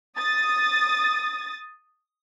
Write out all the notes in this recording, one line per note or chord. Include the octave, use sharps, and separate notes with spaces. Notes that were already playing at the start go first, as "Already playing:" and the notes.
D#6 A6